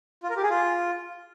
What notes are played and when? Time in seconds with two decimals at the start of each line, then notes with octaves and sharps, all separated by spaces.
0.23 F4
0.30 A#4
0.36 G4
0.43 G#4
0.50 F4